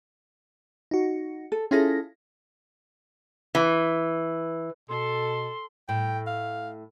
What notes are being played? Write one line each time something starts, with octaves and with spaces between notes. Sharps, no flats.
D#4 F#4
A4
C#4 E4 F4 G#4 A4 A#6
E3
B2 A4 C6
A2 G5
F5